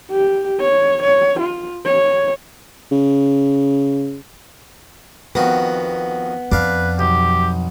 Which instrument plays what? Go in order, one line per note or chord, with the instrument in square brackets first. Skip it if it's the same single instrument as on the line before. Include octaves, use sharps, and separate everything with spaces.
[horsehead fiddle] G4
C#5
C#5
F4
C#5
[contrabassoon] C#3
[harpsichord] F2 D#3 F#4 [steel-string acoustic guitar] B3
[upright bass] F2 [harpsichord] D4 F5 [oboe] B4
[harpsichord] B1 [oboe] G4